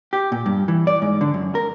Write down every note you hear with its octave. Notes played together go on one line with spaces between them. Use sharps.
G4
A#2
G2
E3
D5
G#2
D3
F#2
A#4